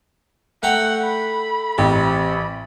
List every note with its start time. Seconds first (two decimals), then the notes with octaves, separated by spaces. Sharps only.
0.63 A3 F#5 G5 A#5
1.03 B5
1.78 A1 C3